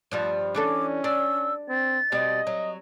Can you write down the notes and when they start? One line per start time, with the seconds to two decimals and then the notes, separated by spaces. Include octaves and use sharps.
0.12 G2 F3 G3
0.55 E3 C#4 D4 A4 D6
1.04 D4 E6
1.69 C4 A6
2.12 B2 G3 C4 D#5
2.47 F#3